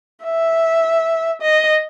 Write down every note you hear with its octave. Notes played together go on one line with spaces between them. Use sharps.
E5
D#5